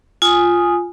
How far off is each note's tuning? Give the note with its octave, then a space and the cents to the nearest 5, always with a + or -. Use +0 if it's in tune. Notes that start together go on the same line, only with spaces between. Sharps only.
F4 +0 G#5 +0 D#6 +0